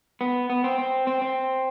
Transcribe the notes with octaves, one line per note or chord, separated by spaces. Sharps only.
B3
B3
C4
C4
C4
C4